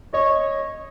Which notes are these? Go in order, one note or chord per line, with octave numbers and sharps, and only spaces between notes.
C#5 D#5